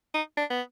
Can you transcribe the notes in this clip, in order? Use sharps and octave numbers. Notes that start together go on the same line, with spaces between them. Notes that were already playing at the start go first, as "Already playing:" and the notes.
D#4
D4
B3